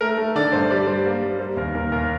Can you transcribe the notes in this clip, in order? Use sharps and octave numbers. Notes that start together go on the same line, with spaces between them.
A3 A#4
A3
D3 D5
G2 C5
G3 D5
G3 C5
A#3
G3
G3 C5
D#2 A#4
D#2 A#4
D#2 A#4